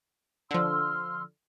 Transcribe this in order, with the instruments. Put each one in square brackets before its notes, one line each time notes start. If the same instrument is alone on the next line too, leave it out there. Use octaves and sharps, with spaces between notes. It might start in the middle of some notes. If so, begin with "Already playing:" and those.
[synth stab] D3 F3 [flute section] C6 E6 F6